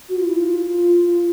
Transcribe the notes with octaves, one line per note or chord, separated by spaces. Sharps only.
F#4
F4
E4
F4